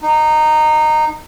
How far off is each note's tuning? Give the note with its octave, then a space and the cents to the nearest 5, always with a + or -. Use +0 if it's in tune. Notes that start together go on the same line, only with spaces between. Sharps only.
D#4 -15